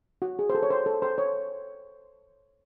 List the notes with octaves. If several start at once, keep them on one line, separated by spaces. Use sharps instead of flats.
F#4
G#4
C5
A4
C#5
C5
A4
C5
C#5